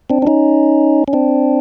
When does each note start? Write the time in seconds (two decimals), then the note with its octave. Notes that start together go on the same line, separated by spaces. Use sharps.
0.10 C4 D4
0.22 D4
0.27 C#4 D#4
1.08 C#4
1.13 C4 D4